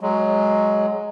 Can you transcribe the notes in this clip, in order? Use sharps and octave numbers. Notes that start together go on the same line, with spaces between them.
F#3 G#3